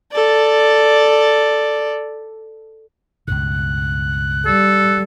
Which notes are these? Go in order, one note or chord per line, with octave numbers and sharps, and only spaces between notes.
A4 D5
C#2 G2 B2 F#6
G3 A4